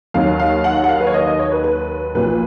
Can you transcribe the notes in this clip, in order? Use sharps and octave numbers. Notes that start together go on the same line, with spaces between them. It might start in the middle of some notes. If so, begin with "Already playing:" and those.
D#2 D#3 F#3 F5
F5
F#5
F#5
F5
B4
C#5
D#5
D#5
C#5
B4
B4
B1 A#2 F3 B4